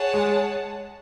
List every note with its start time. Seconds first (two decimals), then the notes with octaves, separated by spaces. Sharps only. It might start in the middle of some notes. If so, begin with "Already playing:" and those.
Already playing: G#4 C#5 F#5 A5
0.14 G#3